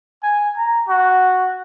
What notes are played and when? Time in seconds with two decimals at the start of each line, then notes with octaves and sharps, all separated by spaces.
0.23 G#5
0.57 A#5
0.89 F#4